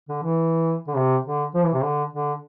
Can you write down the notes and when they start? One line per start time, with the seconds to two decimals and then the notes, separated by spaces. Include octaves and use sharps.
0.09 D3
0.24 E3
0.87 D3
0.96 C3
1.26 D3
1.55 F3
1.63 E3
1.74 C3
1.83 D3
2.13 D3